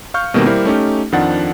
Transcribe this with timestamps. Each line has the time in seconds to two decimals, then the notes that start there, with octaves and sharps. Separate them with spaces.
0.14 F5 C#6 F6 G6
0.34 B2 D#3 G3 A3 A#3 C4
0.46 G3 A#3 E4 A#4 C5
0.65 A3 C#4 D#4 G4
1.12 F2 D#3 F3 D4 F#5 A6